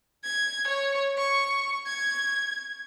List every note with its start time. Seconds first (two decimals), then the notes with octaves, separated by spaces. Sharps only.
0.24 G#6
0.68 C#5
1.17 C#6
1.86 G#6